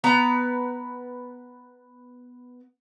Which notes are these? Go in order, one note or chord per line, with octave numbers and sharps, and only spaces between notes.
B3 B4 A#5